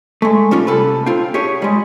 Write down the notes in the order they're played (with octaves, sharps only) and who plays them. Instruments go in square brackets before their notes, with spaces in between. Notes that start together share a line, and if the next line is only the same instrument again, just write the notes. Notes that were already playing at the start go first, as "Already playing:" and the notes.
[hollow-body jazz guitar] G#3 A3
G3 C#4 F4
C3 A4 B4
C4 F4
G4 G#4 C#5
G3 G#3